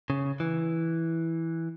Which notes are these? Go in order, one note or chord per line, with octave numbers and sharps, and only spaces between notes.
C#3
E3